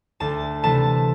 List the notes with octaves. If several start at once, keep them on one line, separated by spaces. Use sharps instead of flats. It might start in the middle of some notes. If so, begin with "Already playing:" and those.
D2 A5
C3 E3 A3 A5